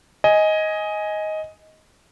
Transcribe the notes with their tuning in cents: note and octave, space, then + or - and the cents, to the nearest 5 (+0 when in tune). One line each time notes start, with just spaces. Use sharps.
D#5 +10 G#5 +0